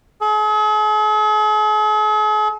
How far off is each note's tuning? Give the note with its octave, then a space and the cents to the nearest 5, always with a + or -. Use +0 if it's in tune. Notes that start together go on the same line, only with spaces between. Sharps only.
G#4 +45